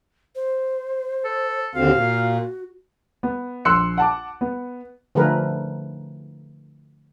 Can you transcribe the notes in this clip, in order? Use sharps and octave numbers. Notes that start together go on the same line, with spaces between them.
C5
A4
D#2 D3 C4 F#4 F5
A#2
B3
A#1 C6 E6 F#6 C#7
F#5 A5 D6
B3
D3 F3 A3 G#4 A#4 B4